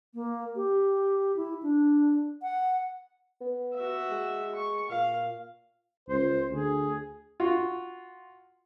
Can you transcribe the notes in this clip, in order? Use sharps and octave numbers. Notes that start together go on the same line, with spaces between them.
A#3
G4
E4
D4
F#5
B3
F#4 E5
G#3
C#6
A#2 F5
C#2 C5
D2 G#4
F4 F#4